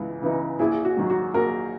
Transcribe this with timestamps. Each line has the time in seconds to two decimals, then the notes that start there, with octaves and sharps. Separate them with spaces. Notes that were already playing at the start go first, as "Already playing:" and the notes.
Already playing: C#2 C#3 E3 B3 D#4
0.22 C#3 E3 B3 D#4
0.59 A#1 E4 G#4
0.85 F#4
0.97 G#2 D#3 F#3
1.10 F#4
1.34 A#1 F#4 A#4